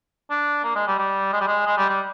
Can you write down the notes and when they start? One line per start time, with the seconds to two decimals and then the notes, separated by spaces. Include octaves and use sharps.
0.30 D4
0.64 A#3
0.75 G#3
0.87 G3
0.99 G3
1.33 G#3
1.41 G3
1.47 G#3
1.66 G#3
1.78 G3
1.90 G3